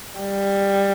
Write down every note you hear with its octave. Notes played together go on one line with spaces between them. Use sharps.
G3